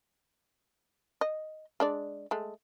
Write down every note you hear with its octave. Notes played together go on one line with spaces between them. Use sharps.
D#5
G#3 D4 D5
G#3 A3